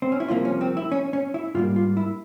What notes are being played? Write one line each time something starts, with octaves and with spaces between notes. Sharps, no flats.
C4
C#4
E4
C2 C3 F3 A#3 F4
C#4
C4
E4
C#4
C#4
E4
G#2 G3 A#3 F4
F4
E4